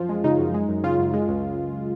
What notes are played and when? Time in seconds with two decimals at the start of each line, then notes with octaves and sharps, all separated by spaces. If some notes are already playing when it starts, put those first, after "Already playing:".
Already playing: F#2 F3 F4
0.09 G#3
0.24 C#3 D#4
0.39 F#2
0.54 G#3
0.69 F#2
0.84 C#3 F4
0.99 F#2
1.14 G#3
1.29 C#2